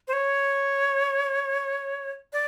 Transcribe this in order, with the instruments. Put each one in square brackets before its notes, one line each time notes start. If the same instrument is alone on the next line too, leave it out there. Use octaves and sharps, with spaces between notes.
[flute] C5
C#5
D5